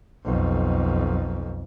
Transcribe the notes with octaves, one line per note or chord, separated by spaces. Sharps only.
B1 F2